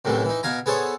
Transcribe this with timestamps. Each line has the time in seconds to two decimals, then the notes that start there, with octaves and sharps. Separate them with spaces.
0.05 F#2 A2 C3 D#3 E3
0.25 E3 D#4
0.43 B2 F5 G#5 A#5
0.66 B3 G#4 A4 C5 C#5